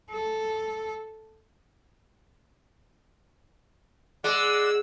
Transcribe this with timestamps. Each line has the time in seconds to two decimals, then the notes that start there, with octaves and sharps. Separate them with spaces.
0.10 A4
4.24 G#3 D5 F#5 E6